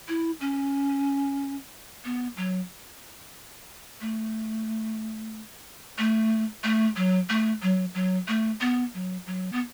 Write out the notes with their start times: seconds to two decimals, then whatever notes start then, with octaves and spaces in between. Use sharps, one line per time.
0.08 E4
0.40 C#4
2.05 B3
2.37 F#3
4.01 A3
5.98 A3
6.64 A3
6.96 F#3
7.30 A3
7.62 F#3
7.95 F#3
8.28 A3
8.61 B3
8.94 F#3
9.27 F#3
9.52 B3